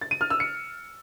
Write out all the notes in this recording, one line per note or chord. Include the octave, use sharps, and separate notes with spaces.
A6
D#7
F6
E6
C#7